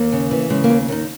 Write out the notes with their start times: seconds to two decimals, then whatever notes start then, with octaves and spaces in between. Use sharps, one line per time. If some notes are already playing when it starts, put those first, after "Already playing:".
Already playing: D#2 A#3
0.12 C#3
0.31 E3
0.50 C#3 G#3
0.64 A#3
0.69 D#2
0.88 D#2 D#4